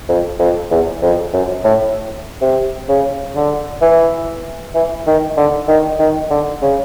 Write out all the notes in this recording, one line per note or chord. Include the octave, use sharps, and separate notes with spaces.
F2
F2
E2
F2
F#2
A2
C3
C#3
D3
E3
E3
D#3
D3
D#3
D#3
D3
C#3